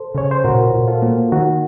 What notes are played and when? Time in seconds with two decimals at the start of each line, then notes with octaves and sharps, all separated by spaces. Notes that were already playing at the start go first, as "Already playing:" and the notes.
Already playing: A4 C5
0.14 C#3 C#5
0.31 C5
0.44 A#2 F#4 A#4
0.73 A#2
0.88 F4 A4
1.02 A#3
1.32 D#3 D#4 F#4